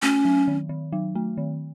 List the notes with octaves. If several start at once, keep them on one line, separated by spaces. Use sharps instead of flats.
A3 C#4
F#3
D#3
D#3
F#3
A3
D#3